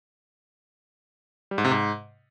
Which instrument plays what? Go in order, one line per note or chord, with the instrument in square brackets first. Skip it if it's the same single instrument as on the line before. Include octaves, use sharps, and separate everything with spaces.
[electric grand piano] G3
G#2
C3
G#2